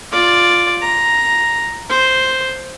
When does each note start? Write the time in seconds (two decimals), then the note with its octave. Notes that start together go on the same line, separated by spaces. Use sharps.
0.12 F4 D5
0.82 A#5
1.90 C5